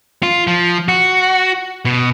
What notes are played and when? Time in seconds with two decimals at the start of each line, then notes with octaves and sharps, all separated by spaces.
0.23 F4
0.47 F3
0.88 F#4
1.85 B2